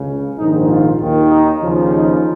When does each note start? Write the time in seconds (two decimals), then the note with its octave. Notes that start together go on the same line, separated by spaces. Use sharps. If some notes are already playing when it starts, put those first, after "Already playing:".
Already playing: C#2 C#3
0.37 A#1 G#2 D#3 D#4
0.69 F4
1.00 D#2 D#3
1.30 D#4
1.62 D#2 C#3 F3
1.94 D#4